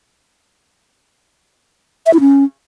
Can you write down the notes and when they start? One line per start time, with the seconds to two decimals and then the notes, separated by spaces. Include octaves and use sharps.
2.06 E5
2.13 E4
2.20 C#4